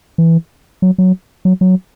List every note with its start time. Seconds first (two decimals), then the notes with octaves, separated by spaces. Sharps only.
0.18 E3
0.82 F#3
0.98 F#3
1.45 F#3
1.61 F#3